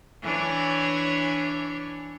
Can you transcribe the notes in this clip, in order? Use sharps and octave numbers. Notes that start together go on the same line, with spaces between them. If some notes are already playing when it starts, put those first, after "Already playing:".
E3 D4 C#5